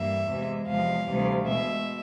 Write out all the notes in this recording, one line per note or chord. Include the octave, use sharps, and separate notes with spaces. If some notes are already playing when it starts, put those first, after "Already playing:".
Already playing: G2 E3 G3 A#3 E5
E2 C3 E3 G#3
E2 C3 F3 G#3 F5
D2 C3 E3 G3
B2 G#3 E5